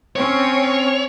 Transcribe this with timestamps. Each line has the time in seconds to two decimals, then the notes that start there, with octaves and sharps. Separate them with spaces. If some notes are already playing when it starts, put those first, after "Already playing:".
0.16 C4 C#4 C#5